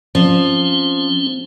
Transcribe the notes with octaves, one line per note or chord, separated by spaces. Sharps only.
F3 C4 C#4